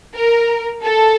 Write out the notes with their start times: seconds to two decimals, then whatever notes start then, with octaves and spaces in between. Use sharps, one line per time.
0.14 A#4
0.82 A4